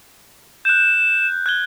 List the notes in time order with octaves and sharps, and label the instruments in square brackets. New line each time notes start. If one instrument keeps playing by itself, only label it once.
[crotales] F#6 G6 [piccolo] E7
[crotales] F#6 G#6 G7